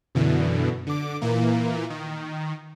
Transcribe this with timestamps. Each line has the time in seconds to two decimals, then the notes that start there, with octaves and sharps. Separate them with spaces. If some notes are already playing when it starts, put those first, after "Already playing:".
0.15 F#2 B2 D3 E3
0.87 D3 D6
1.21 A#2 E3 A#3
1.90 D#3